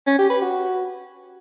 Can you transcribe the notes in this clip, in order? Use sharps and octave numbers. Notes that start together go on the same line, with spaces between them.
C#4
G4
B4
F#4